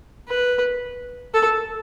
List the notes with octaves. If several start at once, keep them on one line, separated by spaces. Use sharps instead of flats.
B4
A4